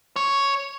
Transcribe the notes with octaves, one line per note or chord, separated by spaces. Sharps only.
C#5